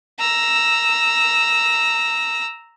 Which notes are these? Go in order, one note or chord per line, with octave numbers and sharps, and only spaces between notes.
A#5 E6